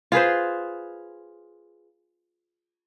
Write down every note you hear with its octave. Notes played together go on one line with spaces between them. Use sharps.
F4 G#4 B4 C5